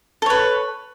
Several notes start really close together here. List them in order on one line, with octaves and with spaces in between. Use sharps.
A4 C#5 B4